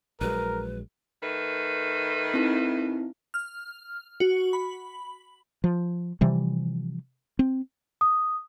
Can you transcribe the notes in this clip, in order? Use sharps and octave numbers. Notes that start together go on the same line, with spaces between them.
A#1 F#3 G#3 A#4 B4
D#3 A3 B4
C4 D#4 E4
F6
F#4
B5
F3
C3 E3 F3 G3
C4
D#6